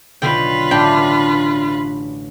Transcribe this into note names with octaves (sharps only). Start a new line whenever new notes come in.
B1 B2 D3 F4 B4 G5
A1 D4 G5 B5